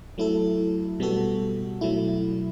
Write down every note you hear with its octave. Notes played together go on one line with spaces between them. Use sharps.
F#3 A3 E4 A4
B2 G3 B3 F#4 A4
B2 F#3 A3 E4